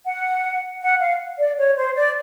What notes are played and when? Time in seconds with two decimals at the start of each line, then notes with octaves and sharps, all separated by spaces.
0.06 F#5
0.82 F#5
1.00 F5
1.39 D5
1.58 C#5
1.77 C5
1.96 D5